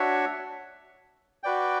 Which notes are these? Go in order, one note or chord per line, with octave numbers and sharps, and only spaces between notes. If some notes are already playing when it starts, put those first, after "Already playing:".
Already playing: D4 F#4 C#5 E5
F#4 B4 D5 G5